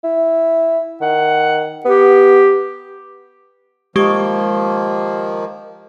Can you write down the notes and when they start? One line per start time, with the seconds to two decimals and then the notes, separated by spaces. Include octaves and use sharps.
0.04 E4
1.01 D#3 F#5
1.85 B3 G4
3.96 D#3 F3 G#3 A#3 G4 C#6